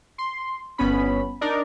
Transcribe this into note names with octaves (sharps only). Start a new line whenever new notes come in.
C6
G1 B3 C#4 B5
D4 D#4 A#4 D5